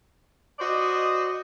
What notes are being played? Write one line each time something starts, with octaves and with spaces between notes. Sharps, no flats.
F#4 C5 D5 D#5